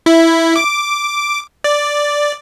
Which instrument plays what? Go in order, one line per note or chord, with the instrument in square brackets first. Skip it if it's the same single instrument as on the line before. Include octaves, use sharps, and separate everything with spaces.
[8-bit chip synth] E4
D6
D5